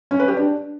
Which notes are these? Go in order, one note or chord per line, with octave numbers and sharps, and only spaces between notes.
C#4
B4
G4
D4